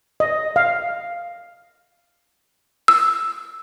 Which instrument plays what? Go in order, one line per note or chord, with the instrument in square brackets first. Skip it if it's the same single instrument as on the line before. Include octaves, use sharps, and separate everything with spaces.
[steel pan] D#5
F5
[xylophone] E6